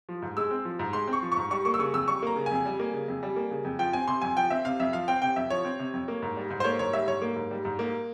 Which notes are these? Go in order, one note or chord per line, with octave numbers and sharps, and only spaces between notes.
F3
G#2
G#3 E6
C4
F3
G#2
G#3 C6
C4
C#6
F3
C#6
G#2
G3 C#6
A#3 C#6
E6
C#3 C#6
F2 E6
G3 C#6
A#3 A#5
C#3
G#5
F2
G3
A#3
C#3
F2
G3
A#3
C#3
F2
F3 G5
C4 G#5
C3 C6
F2 G#5
F3 G5
C4 E5
C3 F5
F2 E5
F3 F5
C4 G5
C3 G5
F2 E5
F3 C#5
C4
C3
F2
A#3
G#2
G3
G#2
C5
A#3 C#5
G#2 C#5
G3 E5
G#2 C#5
A#3
G#2
G3
G#2
A#3